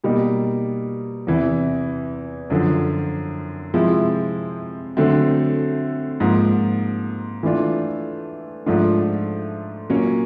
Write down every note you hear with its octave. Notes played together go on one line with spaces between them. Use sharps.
B2 G3 A#3 D#4
E2 C3 E3
F#2 D3 F3
C3 F3 G#3 C4 E4
D3 F#3 A3 C4
G#2 F3 A#3
E3 A3 D4 F4
G#2 F3 A3 D4 F4
A#2 F#3 A#3 C#4